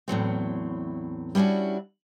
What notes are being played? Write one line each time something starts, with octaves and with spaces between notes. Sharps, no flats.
E2 A2 F#3 C4
G3 C#4 D4 E4 F#4